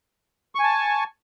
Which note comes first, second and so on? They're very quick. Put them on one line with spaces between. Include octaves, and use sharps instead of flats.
C#6 G#5 A5